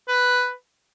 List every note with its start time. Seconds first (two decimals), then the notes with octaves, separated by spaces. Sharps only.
0.08 B4